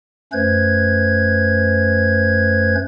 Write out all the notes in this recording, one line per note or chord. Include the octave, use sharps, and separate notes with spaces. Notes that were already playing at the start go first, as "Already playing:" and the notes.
F#2 A3 C#4 B4 C5 G#6